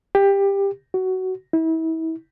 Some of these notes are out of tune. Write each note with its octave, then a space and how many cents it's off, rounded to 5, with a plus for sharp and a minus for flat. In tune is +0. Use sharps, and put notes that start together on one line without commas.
G4 +15
F#4 +15
E4 -35